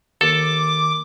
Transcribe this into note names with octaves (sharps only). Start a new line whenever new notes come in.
D#2 A4 D6